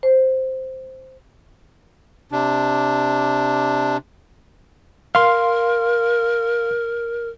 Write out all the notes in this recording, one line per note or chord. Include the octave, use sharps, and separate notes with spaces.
C5
C3 D4
A#4 F5 C6